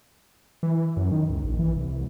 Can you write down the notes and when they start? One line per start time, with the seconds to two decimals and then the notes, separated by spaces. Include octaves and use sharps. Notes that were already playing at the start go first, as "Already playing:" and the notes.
0.63 E3
0.97 F#2
1.12 D#3
1.30 C#2
1.44 A#1
1.59 E3
1.77 C2